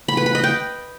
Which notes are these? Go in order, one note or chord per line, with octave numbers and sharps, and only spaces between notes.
B5
B4
B5
D#5
G5